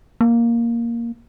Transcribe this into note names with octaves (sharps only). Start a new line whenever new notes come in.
A#3